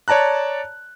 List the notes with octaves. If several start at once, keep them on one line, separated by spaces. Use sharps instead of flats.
C#5 D5 A5 A#5 F#6